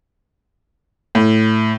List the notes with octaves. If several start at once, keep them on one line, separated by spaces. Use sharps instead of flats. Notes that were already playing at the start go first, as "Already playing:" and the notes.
A2